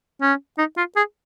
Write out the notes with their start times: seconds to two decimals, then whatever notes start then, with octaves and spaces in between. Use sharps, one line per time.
0.22 C#4
0.58 D#4
0.77 F4
0.96 G#4